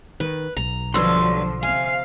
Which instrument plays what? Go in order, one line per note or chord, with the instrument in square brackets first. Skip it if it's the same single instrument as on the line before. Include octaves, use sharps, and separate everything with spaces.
[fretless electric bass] D#3 [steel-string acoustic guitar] B4
[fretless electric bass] B1 [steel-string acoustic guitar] A#5
[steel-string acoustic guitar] G2 F#3 B4 [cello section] D3 F3 [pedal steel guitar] C6 E6
[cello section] C3 F5 [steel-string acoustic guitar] G#5